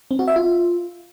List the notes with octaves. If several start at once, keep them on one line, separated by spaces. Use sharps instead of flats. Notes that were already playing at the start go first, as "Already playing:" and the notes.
C4
F#4
E5
F4